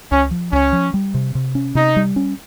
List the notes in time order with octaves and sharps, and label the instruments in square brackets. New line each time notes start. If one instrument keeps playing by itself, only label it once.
[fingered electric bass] C#2 [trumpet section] C#4
[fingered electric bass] F3
[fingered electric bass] C#2 [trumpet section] C#4
[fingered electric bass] F3
G3
C3
C3
C#4
[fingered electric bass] C3 [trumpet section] D#4
[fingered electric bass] G3
C#4